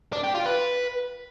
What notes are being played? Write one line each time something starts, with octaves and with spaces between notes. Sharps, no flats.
D4
G4
F4
B4